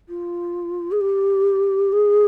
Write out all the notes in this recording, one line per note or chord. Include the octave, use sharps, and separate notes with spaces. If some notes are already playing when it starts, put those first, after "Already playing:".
F4
G#4
G4
G#4